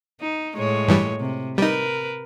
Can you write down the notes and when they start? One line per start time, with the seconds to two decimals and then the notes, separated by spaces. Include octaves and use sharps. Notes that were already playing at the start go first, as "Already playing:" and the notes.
0.21 D#4
0.57 A2 G#3 C#5
0.88 G2 E3 G3
1.20 C3
1.58 G3 D#4 A#4 B4